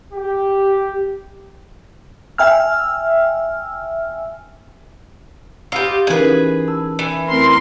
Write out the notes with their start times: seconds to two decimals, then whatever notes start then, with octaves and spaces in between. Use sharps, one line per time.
0.13 G4
2.38 E5 G5 G#5 E6 F6
5.72 F4 G4 D#5 F#5 B5 E6
6.07 E3 B3 C#4 D#4 G#4 A#4 B4
6.68 A5 E6
6.99 E3
7.28 F2 A3 C4 E4 A#4 C6